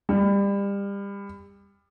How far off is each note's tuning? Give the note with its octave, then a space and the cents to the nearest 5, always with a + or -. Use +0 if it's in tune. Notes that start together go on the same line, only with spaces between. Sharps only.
G3 +30